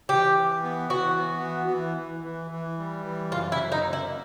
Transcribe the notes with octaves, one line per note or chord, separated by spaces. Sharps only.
E3 G4
E3
B3
E3 F#4
B3
E3
E3
E3
E3
E3
G3
E3
F#2 F4
E4
F#2
D#4
A#3
E4